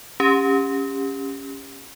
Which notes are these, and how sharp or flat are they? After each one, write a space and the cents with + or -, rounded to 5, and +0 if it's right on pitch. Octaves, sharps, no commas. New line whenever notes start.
C#4 +0 G4 +25